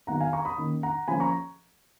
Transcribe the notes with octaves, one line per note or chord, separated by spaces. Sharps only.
D#3 F#3 B3 F#5 A#5
F5 G#5
A#5 C#6
B5 D#6
D#3 A#3 C#4
F#5 A#5
F3 A#3 C#4 G#5 B5
A#5 C#6